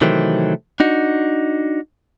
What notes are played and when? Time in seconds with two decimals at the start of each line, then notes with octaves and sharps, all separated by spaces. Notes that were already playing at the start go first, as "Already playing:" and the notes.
0.01 C3 D#3 E3 F#3 A3 C4
0.80 D4 D#4 F#4